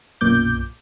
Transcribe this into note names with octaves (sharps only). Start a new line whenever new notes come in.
B1 F#2 A#2 D6 G6